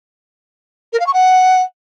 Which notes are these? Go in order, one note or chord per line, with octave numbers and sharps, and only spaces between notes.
A#4
F5
C#6
F#5